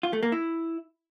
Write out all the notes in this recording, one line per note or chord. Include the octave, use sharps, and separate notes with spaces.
F4
A3
A#3
E4